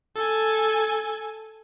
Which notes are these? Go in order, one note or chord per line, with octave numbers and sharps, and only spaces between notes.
A4 G#5